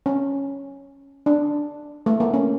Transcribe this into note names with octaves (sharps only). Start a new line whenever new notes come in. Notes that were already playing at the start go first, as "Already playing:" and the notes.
C#4
D4
A3
A#3
C#4